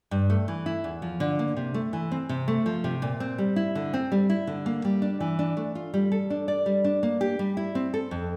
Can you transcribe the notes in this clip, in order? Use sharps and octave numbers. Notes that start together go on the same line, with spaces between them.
G2
A3
E3
E4
E2
F3
D3
A#3
C3
A3
E3
C4
C3
A3
F3
C3
A#2
C4
G3
E4
D3
C4
G3
E4
D3
A#3
G3
D4
E3
D4
A3
F4
G3
A4
D4
D5
G3
D4
A#3
G4
G3
E4
C4
A4
F2